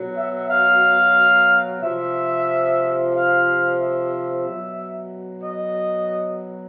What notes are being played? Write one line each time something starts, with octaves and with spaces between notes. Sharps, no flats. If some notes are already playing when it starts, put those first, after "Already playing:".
Already playing: B2 F#3
E5
F5
C3 F3 E5
F5
E5
B2 F#3
D#5